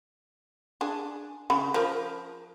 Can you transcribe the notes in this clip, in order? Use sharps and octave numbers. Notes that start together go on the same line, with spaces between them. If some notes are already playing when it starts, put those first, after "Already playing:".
D4 G#4
C#3 B5
F3 A#4